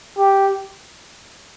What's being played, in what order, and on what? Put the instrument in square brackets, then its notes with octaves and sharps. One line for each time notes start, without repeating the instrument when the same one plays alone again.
[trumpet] G4